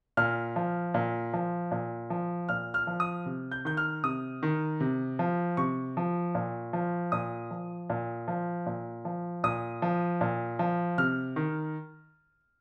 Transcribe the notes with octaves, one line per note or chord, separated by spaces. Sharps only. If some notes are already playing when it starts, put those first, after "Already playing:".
A#2 F6
F3
A#2
F3
A#2
F3
A#2 F6
F6
F3
D#6
C3
G6
D#3 G6
F6
C3 D#6
D#3
C3
F3
C3 C#6
F3
A#2
F3
A#2 D#6
F3
A#2
F3
A#2
F3
A#2 D#6
F3
A#2
F3
C3 F6
D#3